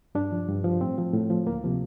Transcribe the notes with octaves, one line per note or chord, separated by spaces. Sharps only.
G2 D4
F3
G2
F3
A2 C4
F3
A2
F3
D2 A#3
C3 F3